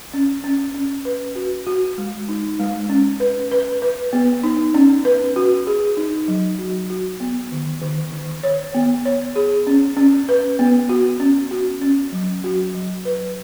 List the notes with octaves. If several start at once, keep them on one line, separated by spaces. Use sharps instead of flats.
C#4
C#4
C#4
B4
F#4
F#4
G#3
D#4
G#3
C#4
B4
B4
B4
B3
D#4
C#4
B4
F#4
G#4
D#4
F#3
F#4
F#4
B3
D#3
D#3
D#3
C#5
B3
C#5
G#4
C#4
C#4
B4
B3
F#4
C#4
F#4
C#4
F#3
F#4
F#3
B4